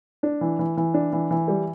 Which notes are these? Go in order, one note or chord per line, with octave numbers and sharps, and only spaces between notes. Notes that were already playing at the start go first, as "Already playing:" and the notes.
D4
E3
E3
E3
D4
E3
E3
G3